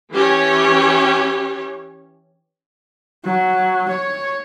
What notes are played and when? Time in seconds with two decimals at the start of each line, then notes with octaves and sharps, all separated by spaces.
0.11 E3 C#4 G4 C#5
3.25 F#3
3.89 C#5